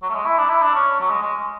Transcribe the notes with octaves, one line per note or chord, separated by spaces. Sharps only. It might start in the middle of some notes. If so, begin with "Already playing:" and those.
F#3
A3
G#3
E4
D4
E4
D4
C#4
F#3
G#3
G#3